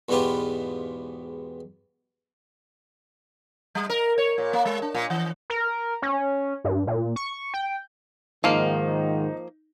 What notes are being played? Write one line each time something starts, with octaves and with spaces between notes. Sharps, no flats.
E2 G#2 B2 B3 F4 G4
G3
A#4
C#5
A#2
A#3
G#3
D4
A#2
E3
A#4
C#4
G2
A#2
C#6
G5
G#2 D#3 F3 A#3 D#4